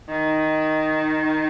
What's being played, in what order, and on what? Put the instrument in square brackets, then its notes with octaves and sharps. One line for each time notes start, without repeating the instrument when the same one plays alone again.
[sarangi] D#3